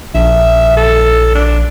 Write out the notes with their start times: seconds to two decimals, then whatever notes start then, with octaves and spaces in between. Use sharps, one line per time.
0.15 A#1 E5
0.77 A4
1.35 D4